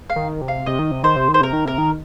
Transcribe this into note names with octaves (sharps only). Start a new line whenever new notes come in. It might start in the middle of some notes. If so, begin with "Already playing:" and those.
F5
D#3
C3
F5
C3 D#5
D#3
C3
D#3 C5
C3
D#3
C5
C3 A#4
D#3
C3 A#4
D#3